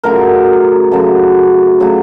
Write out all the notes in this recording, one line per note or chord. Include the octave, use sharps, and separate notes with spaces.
F#2 C#3 F#3 A3 A#4
F#2 C#3 F#3 A3
C#3 F#3 A3